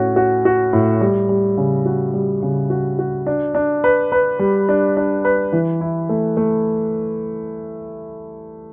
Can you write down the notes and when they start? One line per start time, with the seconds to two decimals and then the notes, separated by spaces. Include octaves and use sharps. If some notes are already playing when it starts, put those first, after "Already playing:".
Already playing: A2 C#4 F#4
0.16 F#4
0.45 F#4
0.73 A2
1.01 G3
1.29 G3
1.57 C#3
1.86 F#4
2.14 G3
2.42 C#3
2.70 F#4
2.99 F#4
3.27 D4
3.55 D4
3.84 B4
4.12 B4
4.39 G3
4.69 D4
4.97 D4
5.25 B4
5.53 E3
5.81 E4
6.09 A3
6.37 A3